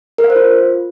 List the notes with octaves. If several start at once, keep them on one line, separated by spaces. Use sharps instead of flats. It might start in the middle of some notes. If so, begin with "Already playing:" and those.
A#4
F5
C5
F4